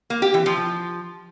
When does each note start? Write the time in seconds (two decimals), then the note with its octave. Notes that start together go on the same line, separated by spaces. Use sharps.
0.10 A#3
0.22 G4
0.34 E3
0.46 F3